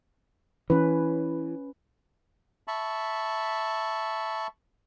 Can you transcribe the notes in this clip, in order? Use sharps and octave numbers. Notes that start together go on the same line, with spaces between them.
E3 C#4 B4
E5 A5 B5 C#6